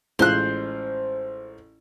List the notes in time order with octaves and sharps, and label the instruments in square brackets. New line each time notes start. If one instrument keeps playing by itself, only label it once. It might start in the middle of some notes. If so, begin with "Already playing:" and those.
[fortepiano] A1 G#3 F4 [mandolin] C5 F#6